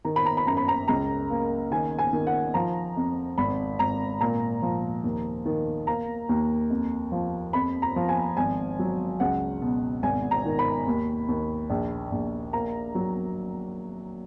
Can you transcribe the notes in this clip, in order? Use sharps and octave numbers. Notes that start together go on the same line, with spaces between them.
D#3 A#5
B5
A#5
B5
F#2 A#5
B5
A#5
C#2 A#5
A#3
D#3 G#5
G#5
D#3
F#5
F3 A#5
F2
G#1 B5
G#1 A#5
A#2 A#5
F3
D#2
D#3
A#3 A#5
D#2
F2
F3
F2 B5
A#5
F3
G#5
G#1 G#5
F#3
C#2 F#5
B2
G#1 G#5
A#5
D#3
B5
D#2
D#2
A#1
A#1
A#3 A#5
F#3